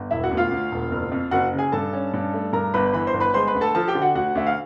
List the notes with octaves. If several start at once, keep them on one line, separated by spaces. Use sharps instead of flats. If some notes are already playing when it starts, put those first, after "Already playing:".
Already playing: G1
E1 E4 E5
F#4 F#5
D2
F4 F5
D2
E1
F#1
F2
F#1 F#4 F#5
C#3
G#4 G#5
G2 A4 A5
C#4
G2
A3
G2 A#4 A#5
G1 B4 B5
E3 B4 B5
C5 C6
G1
B4 B5
G#3 C5 C6
B4 B5
D2
A4 A5
F3 A4 A5
G4 G5
D3
F#4 F#5
D2 F#4 F#5
D2 E5
F5